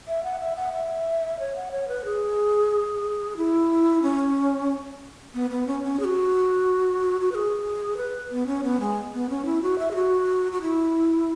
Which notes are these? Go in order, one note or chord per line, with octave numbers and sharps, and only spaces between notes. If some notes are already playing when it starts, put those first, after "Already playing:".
E5
F#5
E5
F#5
E5
C#5
F#5
C#5
B4
G#4
E4
C#4
B3
B3
C#4
C#4
G#4
F#4
F#4
B4
G#4
B4
B3
C#4
B3
G#3
B3
C#4
E4
F#4
E5
G#4
F#4
F#4
E4